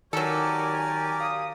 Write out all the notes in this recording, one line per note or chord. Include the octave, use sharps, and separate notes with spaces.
D#3 F#3 G4 A4 A#4 C#5 D5 G#5
F5 D#6